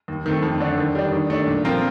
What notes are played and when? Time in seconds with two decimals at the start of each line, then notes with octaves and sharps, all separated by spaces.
0.08 D#2
0.26 D#3 A3 C4
0.42 F2
0.60 D3 A3 D4
0.78 D#3
0.95 G3 D4
1.12 D#3
1.30 A3 D4
1.47 A#2
1.65 F3 C4 F4 A#4